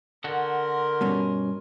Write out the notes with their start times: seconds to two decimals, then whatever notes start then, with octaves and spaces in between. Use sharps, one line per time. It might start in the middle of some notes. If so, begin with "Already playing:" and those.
0.24 D3 F#4 A#4 C6
1.01 G2 B2 C#4